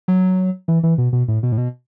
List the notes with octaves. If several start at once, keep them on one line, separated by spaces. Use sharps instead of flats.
F#3
E3
E3
B2
B2
A2
B2
A2
B2